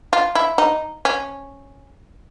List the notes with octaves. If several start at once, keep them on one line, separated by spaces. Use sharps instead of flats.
F4
E4
D#4
C#4